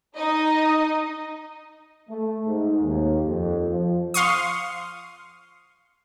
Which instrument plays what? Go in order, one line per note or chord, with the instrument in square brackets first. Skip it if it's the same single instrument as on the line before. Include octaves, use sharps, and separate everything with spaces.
[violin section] D#4 D#5
[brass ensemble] A3
G#2
D#2
F2
F3
[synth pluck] F5 C6 C#6 D#6